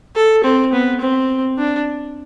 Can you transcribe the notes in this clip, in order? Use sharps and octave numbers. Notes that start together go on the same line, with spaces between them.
A4
C4
B3
C4
D4